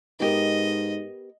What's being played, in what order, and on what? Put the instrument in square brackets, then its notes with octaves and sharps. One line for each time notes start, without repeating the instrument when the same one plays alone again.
[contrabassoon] G#2 [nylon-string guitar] B3 G4 A#4 [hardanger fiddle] D#5